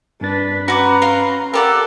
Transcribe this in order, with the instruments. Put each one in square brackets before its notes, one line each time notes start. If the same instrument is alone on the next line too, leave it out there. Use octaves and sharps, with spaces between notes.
[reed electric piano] G2 A6 [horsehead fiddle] D4 B4
[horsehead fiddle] C#4 A#5 [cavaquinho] F#4 D6 [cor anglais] B4
[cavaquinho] F5 C6
[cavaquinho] G4 D5 F#5 [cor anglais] A4 [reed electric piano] A#4